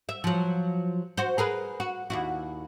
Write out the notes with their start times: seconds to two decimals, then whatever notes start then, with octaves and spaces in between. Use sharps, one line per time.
0.09 E5
0.24 F3 F#3
1.17 F#4 C5
1.38 G#4 A#4 B4
1.80 F#4
2.10 D#2 E4 F#4